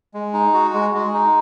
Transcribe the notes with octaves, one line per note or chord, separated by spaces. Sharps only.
G#3
D#4
F#4
G#3
G#3
D#4